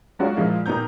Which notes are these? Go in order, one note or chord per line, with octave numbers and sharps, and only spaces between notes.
F#3 G#3 C#4 F4 F#4 D5
A#2 F3 G#3 E4 F4
A#2 D#3 B3 A#5 G6